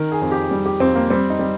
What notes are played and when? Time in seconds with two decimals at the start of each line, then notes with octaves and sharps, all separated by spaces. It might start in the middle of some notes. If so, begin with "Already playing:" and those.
Already playing: D#3 A#4
0.12 G#4
0.21 F2
0.32 G4
0.51 G3
0.66 G4
0.80 F2 C4
0.96 A#3
1.10 G3 C4
1.30 D#4
1.39 G3